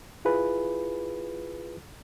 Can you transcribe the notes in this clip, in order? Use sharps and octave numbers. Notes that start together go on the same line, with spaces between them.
E4 F4 G#4 B4